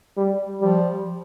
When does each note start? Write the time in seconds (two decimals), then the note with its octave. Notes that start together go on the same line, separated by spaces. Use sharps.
0.17 G3
0.61 F3 G3